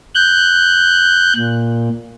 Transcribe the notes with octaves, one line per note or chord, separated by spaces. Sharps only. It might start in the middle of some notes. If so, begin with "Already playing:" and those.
F#6 G6
A#2